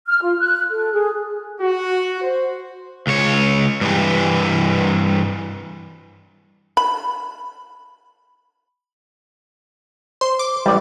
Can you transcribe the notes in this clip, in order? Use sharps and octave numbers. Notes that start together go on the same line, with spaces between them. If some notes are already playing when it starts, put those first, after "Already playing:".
F6
F4
F#6
A4
G#4
F#4
C5
C#2 C#5
G2 E3
B5
C5 C6
D6
A1 G3 D5